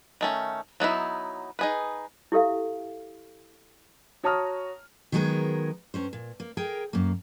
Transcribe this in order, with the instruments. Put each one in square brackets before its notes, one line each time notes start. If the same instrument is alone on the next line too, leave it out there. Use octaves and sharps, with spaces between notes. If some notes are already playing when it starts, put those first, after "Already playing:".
[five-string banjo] D#3 A3 C#4
F#3 B3 D#4 E4
D#4 G#4 B4
[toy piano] E4 G4 A4 E5 F5
[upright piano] F#4 C#5 A5 A#5 D#6 F6
[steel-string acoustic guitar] D#3 F#3 G#3 B3 G#4 A#4
G2 C#4 C5
A#2
A#3
G#4 A#4 G5
F#2 A#3